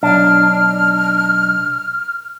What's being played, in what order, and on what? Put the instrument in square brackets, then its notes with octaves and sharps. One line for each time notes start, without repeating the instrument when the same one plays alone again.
[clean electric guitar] B1 D4 [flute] F6